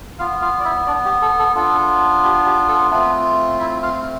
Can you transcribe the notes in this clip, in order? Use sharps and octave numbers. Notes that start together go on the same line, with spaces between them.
B3 F4 F5
F4 F5
D5
E4 E5
D4 D5
G4
A4
A4
B3 D4 F4 A4
G4
G4
A4
A3 B3 C4 F4 B4
E4 E5
F4 F5